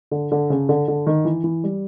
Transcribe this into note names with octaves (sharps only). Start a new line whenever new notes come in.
D3
D3
C#3
D3
D3
D#3
E3
E3
G3